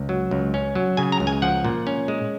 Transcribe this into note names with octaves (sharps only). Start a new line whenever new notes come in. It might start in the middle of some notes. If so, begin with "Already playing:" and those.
Already playing: C#2
F#3
C#2
C#4
F#3
C#3 G#5
A#5
C#2
G#5
F3 F#5
A#2
C#4
G#3